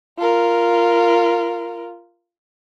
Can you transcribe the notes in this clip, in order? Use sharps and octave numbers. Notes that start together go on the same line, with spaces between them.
F4 A#4